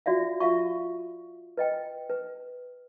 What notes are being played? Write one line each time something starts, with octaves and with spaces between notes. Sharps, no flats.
F4 F#4 D5 E5 F5
F4 E5 F5 C#6
B4 D#5 G5
B4